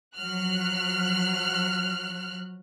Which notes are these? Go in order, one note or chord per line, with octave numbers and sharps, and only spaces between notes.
F3 F#3 F6 F#6